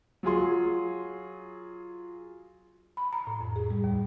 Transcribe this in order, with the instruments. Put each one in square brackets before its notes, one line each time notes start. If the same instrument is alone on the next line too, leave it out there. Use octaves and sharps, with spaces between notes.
[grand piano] F#3 F4 G#4 C6
[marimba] B5
A#5
A2
F2
G#4
G3
D#2